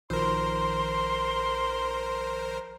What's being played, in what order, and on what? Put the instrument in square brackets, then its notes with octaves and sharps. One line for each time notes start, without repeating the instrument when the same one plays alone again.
[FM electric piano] A#1 D#3 F3 [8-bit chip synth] A#4 C5 [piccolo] C6